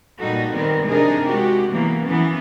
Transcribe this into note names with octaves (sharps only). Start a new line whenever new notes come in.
A#2 G3 D#4 F#4 A4
D#3 G3 B3 C4 A#4
C3 D4 D#4 G#4 A#4
G#3 F#4 G4
E3 F#3 A#3 B3
E3 B3 C#4